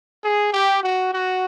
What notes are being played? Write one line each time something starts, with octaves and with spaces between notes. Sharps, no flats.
G#4
G4
F#4
F#4